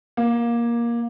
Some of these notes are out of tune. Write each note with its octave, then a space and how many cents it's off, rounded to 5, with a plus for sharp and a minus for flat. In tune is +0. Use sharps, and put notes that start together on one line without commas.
A#3 +15